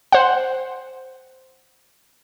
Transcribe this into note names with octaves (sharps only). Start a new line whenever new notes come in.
C5 F#5